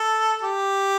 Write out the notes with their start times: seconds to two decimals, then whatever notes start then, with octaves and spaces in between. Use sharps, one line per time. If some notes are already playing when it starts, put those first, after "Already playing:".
Already playing: A4
0.42 G4